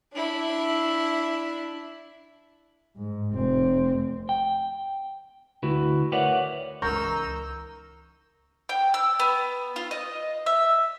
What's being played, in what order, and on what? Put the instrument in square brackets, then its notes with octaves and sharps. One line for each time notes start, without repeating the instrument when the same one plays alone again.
[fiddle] D4 E4
[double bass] G#2
F1 C4
[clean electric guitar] G5
D2 E4 F#4 B4
A#4 B4 C#5 D5 E5 F#5
[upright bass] C#2 E3 [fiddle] D#4 E6 [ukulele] A#4 [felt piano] C#6 G6
[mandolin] G5
E6
B3
F4
D#5
E5